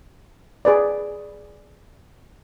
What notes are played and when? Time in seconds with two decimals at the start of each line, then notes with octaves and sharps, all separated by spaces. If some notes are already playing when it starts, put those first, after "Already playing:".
0.65 G#4 B4 D5